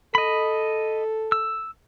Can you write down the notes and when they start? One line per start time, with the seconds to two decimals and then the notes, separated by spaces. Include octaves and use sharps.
0.15 A4 D#5 B5
1.32 E6